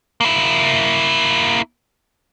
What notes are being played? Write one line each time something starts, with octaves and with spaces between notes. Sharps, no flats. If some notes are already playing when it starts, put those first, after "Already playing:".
A#3 E4